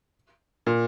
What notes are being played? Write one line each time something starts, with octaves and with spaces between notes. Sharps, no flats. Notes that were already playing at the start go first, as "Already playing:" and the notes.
A#2